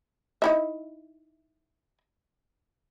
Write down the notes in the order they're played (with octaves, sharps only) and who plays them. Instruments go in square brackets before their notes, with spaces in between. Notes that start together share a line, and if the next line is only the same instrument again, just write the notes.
[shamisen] D#4 E4 E5